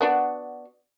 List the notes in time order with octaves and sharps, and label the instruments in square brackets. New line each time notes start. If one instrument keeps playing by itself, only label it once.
[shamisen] B3 D4 F#4